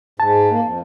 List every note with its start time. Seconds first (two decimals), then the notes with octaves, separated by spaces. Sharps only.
0.20 G#2 A5
0.51 A#3
0.64 F2